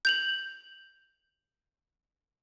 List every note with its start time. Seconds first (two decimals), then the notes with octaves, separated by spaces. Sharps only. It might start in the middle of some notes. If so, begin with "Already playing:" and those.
0.05 G6 F7 F#7